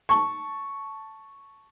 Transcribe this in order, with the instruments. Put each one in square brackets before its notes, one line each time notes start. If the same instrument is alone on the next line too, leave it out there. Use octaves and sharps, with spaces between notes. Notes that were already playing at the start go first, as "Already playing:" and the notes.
[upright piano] A5 C#6